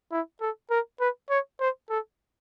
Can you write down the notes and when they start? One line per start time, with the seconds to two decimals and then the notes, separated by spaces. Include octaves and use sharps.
0.12 E4
0.41 A4
0.70 A#4
1.00 B4
1.30 C#5
1.60 C5
1.90 A4